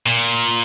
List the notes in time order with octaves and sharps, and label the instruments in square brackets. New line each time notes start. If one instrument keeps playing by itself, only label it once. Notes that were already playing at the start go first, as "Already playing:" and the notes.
[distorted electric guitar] A#2